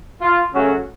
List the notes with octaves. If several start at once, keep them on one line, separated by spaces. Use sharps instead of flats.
F4
F#2 C#3 F#3 A3 C#4 F#4